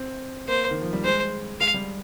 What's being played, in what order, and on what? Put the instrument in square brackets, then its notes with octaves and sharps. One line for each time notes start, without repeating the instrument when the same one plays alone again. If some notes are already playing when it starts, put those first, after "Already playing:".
Already playing: [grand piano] C4
[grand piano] A#3 [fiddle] C5
[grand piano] D#3
F3
G3
[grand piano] G#3 [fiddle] C5
[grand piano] G#3 [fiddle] F5
[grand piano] G3